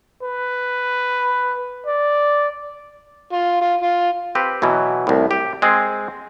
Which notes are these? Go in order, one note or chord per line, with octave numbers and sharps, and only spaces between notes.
B4
D5
F4
F4
F4
C4 G4 B4
B2 E3 F#3
C2 A2
G4
G#3 C4 G#4